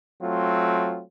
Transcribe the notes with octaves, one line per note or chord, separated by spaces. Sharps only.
F#3 A3 C4 F4